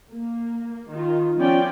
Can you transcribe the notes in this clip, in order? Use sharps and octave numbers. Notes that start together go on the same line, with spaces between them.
A#3
D#3 F4
F3 B3 C#4 F4 D5 G5